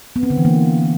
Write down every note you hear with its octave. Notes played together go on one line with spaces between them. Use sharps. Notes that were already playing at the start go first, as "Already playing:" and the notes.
B3
C4
D3
E3
A#3